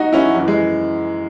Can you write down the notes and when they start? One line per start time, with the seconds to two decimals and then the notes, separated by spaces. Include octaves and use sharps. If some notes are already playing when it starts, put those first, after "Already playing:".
Already playing: D#4 F#4
0.13 C#4 E4
0.35 F#2 E3
0.48 G#3